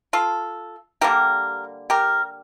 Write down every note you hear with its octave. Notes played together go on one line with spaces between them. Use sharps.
F4 A4
D3 G3 A#3 G4 A#4
G4 A#4